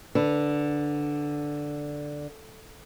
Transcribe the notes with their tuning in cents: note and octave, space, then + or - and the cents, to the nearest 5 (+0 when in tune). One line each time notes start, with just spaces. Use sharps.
D3 +0 B4 +15